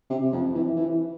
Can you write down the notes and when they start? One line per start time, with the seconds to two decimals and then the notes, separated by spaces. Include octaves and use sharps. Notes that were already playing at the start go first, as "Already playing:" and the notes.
0.10 C3
0.33 F2
0.55 E3
0.77 E3